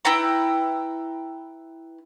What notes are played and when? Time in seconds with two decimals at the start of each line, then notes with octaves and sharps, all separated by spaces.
0.05 E4 B4 G5 A#5